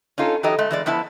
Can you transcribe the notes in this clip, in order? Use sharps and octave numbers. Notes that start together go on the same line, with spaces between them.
C#4 D#4 F4 A4
E3 F#3 D#4 G4 A4 D#5
G#3 A3
E3 G#3 D5
F3 B3 E4 A5